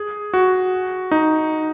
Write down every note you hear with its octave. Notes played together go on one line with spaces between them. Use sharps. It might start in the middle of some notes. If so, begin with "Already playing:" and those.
Already playing: G#4
F#4
D#4